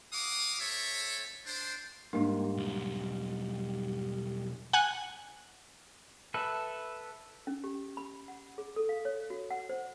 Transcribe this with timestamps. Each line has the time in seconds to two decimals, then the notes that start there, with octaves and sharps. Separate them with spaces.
0.13 F#4 F5 D6 D#6
0.60 C4 A4 C#5 E5
1.46 D4 C5
2.13 G#2 G3 A#3 D4 D#4
2.57 B1 E2
4.73 F#5 G#5 F#6
6.34 A4 B4 E5
7.47 C#4
7.64 G4
7.97 B5
8.28 F#5
8.58 G#4
8.76 A4
8.89 F5
9.05 C#5
9.30 F#4
9.50 F#5
9.69 C5